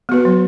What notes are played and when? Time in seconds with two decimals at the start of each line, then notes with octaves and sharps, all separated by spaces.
0.09 B3 F#4 B4
0.25 F#3